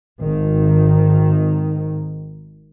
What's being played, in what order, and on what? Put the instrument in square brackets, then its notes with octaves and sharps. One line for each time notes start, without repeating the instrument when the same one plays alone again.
[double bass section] G#1 D#3